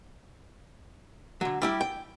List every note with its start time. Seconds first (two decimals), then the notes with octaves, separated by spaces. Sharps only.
1.41 D3 F#3
1.62 G3 E4 G4
1.81 G5